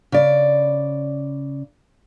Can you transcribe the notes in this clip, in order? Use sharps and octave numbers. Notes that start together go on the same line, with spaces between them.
C#3 D5